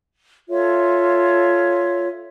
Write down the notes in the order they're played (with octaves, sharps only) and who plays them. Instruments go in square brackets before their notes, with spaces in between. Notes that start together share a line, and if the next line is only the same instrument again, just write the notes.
[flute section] F4 A4 C#5 E5